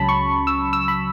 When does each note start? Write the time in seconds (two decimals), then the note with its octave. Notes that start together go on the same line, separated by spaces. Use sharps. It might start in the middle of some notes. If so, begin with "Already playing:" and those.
Already playing: C#2 C#3 F#3 C#4 A5 B5
0.09 C#6
0.47 E6
0.73 E6
0.88 B5